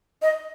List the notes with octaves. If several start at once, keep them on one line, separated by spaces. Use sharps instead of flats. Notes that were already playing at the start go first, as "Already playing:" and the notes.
D#5